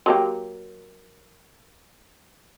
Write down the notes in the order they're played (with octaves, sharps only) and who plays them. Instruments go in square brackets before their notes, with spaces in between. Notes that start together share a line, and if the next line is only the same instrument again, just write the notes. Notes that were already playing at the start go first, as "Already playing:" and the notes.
[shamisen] F#3 A#3 G4